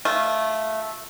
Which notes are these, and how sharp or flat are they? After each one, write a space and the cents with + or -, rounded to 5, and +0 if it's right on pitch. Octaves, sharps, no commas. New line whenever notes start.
A3 -10 F4 -15